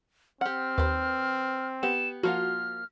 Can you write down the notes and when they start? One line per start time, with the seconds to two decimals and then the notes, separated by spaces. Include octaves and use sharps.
0.41 C4 G4 F#5 F6
0.78 D#2 B4 C5
1.83 B3 G4 E7
2.23 F3 A#3 F4 F#4 F6